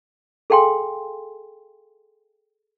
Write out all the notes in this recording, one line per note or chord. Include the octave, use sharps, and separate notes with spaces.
G#4 A4 F5 G5 G#5 C6